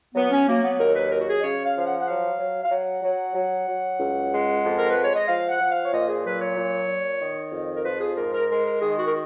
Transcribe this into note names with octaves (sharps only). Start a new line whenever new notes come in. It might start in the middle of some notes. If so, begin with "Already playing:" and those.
F#3 B3
C#4
F#3 A#3
B3
D#2 A#4
B4
F#3 A#4
F#4
G#4
D#5
C#3 C#5
F5
F3 F5
F#5
F#5
F#3 F5
F#3
F5
F#3 F#5
F#3
F#3
F#3
C#2
G#3
F2
A#4
B4
G#3
C#5
D#5
F3 F5
F#5
F3
F5
C#5
A#2 D#5
G#4
F#3 B4
C#5
A#2
A#2
D#3
F2
A#4
F3 B4
G#4
G#2 A#4
A#4
G#3 A#4
A#4
D#3 G#4
F#4
A#4